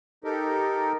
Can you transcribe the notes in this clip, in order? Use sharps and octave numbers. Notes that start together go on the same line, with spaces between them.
D#4 G4 A4 A#4